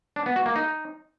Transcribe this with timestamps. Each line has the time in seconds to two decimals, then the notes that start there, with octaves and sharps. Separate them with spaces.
0.16 D4
0.26 B3
0.36 F#4
0.46 A#3
0.56 D#4